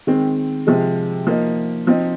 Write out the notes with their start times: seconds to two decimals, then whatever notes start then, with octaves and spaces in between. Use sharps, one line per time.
0.07 D#3 G#3 C4
0.67 C3 F3 G#3
1.27 F3 A#3 D#4
1.87 F3 C4 D#4